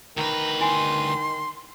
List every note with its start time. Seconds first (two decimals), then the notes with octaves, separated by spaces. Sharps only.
0.17 D2 D#3 B4 A#5
0.61 E4 G#5 C6